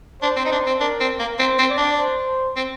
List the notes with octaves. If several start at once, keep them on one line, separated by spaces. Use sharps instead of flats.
D4 C5
C4
D#4
D4
C4
D4 A#4
C4
A#3
C4 C5
C4
D5
D4
C5
C4